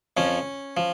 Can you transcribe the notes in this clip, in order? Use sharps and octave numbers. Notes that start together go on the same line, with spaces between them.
F2 F3 C#4
F3